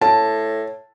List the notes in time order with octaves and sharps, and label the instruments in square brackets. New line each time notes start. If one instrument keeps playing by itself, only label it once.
[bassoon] A2 [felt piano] A5